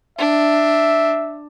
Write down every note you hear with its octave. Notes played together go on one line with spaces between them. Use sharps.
D4 E5